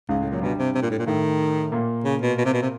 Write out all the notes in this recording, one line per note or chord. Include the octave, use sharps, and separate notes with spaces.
C#2 G#2 C#3
A2
A#2 F#3
G2 B2 G3
C3
C3
A#2
A2
A#2
A2 D#3 A3
A#2 A#3
C#3
B2
B2
C3
B2
C3